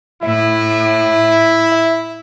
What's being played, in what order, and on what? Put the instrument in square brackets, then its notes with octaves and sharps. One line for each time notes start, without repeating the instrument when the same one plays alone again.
[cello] A2 [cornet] E4 [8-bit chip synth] E5